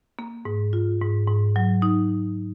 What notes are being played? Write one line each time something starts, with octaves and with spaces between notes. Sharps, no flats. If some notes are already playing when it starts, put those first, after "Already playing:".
A#3
G#2
F4
G#2
G#2
F#3
D#4